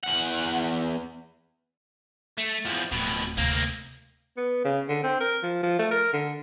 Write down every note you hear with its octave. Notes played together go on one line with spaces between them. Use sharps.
E2 F#5
A3
E2 F3
D1 F2 B2
D2 C3 A#3 C4
B3
C#3
D3
C4
A#4
F3
F3
A3
A#4
D3